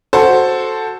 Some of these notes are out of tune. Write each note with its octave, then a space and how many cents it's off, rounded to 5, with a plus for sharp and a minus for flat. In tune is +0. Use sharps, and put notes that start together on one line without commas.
F#4 +0 A4 +0 C5 +0